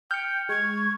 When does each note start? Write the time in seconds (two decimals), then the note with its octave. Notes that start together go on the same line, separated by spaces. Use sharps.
0.11 G5 F6 G6 C#7
0.49 G#3 C#6 G#6